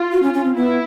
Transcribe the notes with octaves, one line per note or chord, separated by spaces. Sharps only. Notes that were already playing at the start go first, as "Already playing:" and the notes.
Already playing: F4
F#4
C#4
C#4
C4
B3 E4